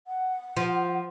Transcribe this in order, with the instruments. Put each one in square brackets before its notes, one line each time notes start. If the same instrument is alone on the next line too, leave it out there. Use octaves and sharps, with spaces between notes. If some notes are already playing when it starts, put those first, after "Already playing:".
[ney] F#5
[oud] F3